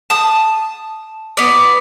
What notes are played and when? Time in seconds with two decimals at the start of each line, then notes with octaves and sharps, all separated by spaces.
0.10 A5 D#6
1.37 B3 D5